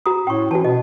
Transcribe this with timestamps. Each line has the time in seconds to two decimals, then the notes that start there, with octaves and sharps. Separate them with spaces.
0.06 F#4 A#5 D#6
0.27 A2 G5 C#6
0.51 E3 F#4 A5
0.65 B2 D#5